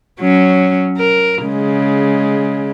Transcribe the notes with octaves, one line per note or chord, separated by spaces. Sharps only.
F#3 C#4
A#4
C#3 G#3